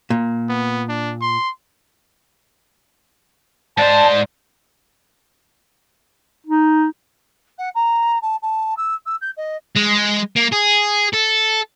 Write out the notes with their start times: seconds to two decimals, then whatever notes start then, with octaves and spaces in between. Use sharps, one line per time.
0.10 A#2
0.49 B3
0.89 D4
1.21 C6
3.78 G#2 C5 D5 A5
6.47 D#4
7.58 F#5
7.75 A#5
8.22 A5
8.42 A5
8.77 E6
9.06 E6
9.21 G6
9.37 D#5
9.76 G#3
10.36 A#3
10.52 G#4
11.13 A4